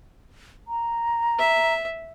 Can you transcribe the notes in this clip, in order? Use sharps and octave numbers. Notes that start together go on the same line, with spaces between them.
A#5
E5